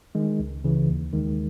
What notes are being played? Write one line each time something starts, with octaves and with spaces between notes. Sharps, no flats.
D#3 G#3
C#2
C#3 E3
D#2
D#3 G#3